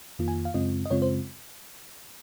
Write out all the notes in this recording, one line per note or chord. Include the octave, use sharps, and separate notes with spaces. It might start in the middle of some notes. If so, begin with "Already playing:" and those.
F2 D#3 A#3 F4
G#5
F5
F#2 C#3 G#3 C4 F4 D#5
D#5
F#2 C#3 G#3 C4 F4 C#5
C5